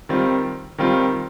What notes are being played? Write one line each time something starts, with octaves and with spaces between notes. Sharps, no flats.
D#3 G3 C4 F4
D#3 G3 C4 F4